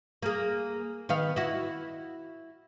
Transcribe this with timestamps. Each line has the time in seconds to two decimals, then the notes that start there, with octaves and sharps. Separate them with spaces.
0.22 A#3 G#4
1.09 D#3 B3 F5
1.36 E4 F#4